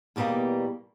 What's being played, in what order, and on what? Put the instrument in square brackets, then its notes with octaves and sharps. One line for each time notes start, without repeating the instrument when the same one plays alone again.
[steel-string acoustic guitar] E2 B2 G3 A3 A#3